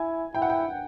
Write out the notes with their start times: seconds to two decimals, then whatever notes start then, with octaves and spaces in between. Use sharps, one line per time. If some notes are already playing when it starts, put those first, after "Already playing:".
Already playing: E4 G#5
0.34 E4 G5
0.42 F#5
0.49 G5